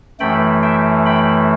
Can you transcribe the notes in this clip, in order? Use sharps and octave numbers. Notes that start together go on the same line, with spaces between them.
F#2 E3 A3 G5 B5
E5 G5
G5 B5